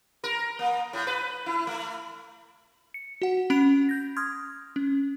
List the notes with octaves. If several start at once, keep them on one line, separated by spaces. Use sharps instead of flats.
A#4
A#3
A2
B4
E4
A3
C#7
F#4 F#5
C#4 B5 D7 F7
G6 A#6
C6 D#6 F6 G#6
C#4